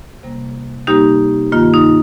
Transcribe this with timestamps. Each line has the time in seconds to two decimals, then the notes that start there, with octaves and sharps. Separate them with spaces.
0.23 C3 G3 A#3
0.87 C3 G3 A#3 D#4 G4
1.52 G2 D#3 A#3 F4
1.74 D#4